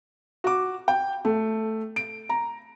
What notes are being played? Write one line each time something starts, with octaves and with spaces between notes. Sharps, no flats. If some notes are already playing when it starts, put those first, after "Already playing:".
F#4 D6
G5
A3
D7
A#5